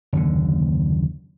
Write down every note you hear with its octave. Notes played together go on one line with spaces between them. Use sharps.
F#1 D#2 D3